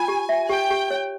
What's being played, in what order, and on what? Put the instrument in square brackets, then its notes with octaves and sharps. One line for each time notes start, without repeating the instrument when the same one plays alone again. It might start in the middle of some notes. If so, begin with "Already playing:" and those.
Already playing: [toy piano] F4 [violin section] G#5
[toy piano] G4
E5
[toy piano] G4 [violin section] G5
[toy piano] G4
C#5